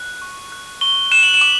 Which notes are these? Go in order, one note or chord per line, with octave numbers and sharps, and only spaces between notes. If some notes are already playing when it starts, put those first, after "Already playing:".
Already playing: F#6
C#6
F#6
C#6 G7
F#6 E7
F#7
E7
D6